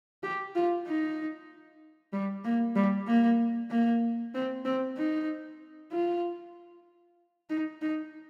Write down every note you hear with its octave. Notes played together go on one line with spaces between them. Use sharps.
G4
F4
D#4
G3
A#3
G3
A#3
A#3
C4
C4
D#4
F4
D#4
D#4